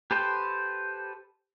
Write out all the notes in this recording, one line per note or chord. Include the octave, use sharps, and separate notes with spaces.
G4 A4 B4 C5 G5